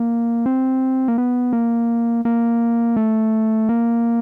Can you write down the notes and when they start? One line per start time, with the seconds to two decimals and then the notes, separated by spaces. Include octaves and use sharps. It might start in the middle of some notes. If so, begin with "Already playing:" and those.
Already playing: A#3
0.46 C4
1.08 A#3
1.18 B3
1.53 A#3
2.25 A#3
2.97 A3
3.69 A#3